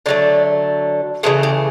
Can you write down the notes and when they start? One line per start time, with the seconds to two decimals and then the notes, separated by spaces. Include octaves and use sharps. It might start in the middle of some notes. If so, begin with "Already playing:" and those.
0.06 D3 F#3 A3 D5
1.23 C#3 E3 A3 G#4
1.43 G4